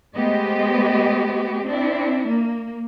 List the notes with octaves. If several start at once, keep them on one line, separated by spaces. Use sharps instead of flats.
G#3 A3 B3 G4 C5 D#5
C4 D4 E4
A#3